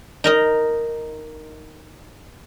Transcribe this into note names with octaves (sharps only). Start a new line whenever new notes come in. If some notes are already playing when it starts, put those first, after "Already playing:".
D#4 A#4 D#5